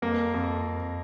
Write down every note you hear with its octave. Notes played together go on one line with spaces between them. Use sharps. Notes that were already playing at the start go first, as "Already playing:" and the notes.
F2 A#3
F2